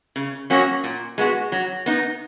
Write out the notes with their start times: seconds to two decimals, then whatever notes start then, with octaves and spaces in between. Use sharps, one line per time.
0.16 C#3
0.50 F#3 A#3 C#4 F#4
0.84 A#2
1.18 G#3 B3 F#4
1.52 F#3
1.86 B3 D#4